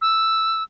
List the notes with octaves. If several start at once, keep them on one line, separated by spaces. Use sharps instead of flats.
E6